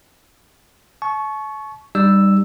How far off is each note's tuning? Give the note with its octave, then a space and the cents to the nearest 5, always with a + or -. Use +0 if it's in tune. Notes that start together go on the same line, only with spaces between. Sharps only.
A5 -40 C#6 +0
G3 +0 D#4 -35 E6 +0